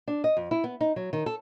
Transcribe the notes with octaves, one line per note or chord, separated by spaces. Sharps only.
D4
D#5
F2
E4
B3
D#4
F#3
D#3
A4